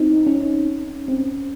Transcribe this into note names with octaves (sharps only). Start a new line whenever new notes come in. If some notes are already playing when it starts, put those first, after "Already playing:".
Already playing: C4 D#4
C#4
C4